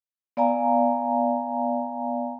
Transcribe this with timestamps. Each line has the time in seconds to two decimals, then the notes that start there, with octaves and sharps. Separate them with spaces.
0.37 B3 D5 F5 G#5 A#5